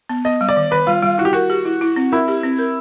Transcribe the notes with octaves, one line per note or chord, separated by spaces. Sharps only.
B3
B3 D#5
G3
D5
D#3
D#3 B4
G3 F4
G3 F4
E4 F#4
G4
F#4 A#4
G4
E4
E4
C4
E4 A#4
G4
C4
A#4